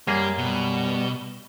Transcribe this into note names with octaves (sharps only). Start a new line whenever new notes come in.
F#2 G3 A#3 G#4
B2 G3